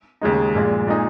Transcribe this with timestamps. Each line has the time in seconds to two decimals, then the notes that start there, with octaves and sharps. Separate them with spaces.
0.21 D#2 C#3 G#3 D#4
0.55 A#1 A#2 G#3
0.87 A#2 G#3 D#4 G#4